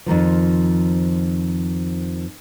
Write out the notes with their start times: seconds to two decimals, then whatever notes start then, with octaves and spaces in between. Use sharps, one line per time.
0.06 F2 A#2 D#3 F3